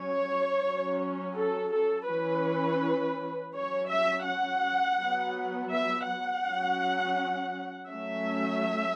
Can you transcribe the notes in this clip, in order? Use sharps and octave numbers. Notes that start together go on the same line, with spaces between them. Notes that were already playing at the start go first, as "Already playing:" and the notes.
Already playing: F#3 C#4 C#5
F#3 C#4
A4
A4
E3 C#4 B4
F#3 C#4 C#5
E5
F#5
F#3 B3
E5
F#5
F#3 C#4
F#3 A3 C#4 E5